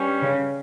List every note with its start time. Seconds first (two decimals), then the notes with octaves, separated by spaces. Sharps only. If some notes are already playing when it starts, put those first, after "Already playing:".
Already playing: G2 G3 C#4
0.22 C#3